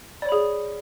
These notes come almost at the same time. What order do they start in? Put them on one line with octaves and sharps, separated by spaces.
D5 C#5 B5 G#4